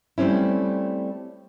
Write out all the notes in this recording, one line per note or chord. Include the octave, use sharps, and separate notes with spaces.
G3 A3 C4 C#4 E4